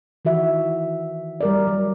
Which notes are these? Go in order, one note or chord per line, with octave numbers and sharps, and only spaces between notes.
D#3 E3 F#4 E5
G3 A#4 D5
F#3